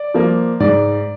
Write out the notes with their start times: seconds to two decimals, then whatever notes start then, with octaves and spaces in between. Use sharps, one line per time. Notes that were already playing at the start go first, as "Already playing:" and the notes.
Already playing: D5
0.14 F3 A#3
0.60 G#2 D5